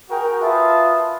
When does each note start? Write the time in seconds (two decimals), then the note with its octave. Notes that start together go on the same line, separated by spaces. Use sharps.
0.10 F#4 G#4 A#4 G5
0.41 F4 B4 E5 A5 D#6